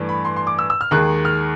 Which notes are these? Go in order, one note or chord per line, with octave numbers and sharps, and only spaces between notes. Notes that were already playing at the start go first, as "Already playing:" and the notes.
Already playing: G2 E3 A3 D4
B5
C6
C6
D6
E6
E6
F6
D#2 D#3 G#3 F#6
F6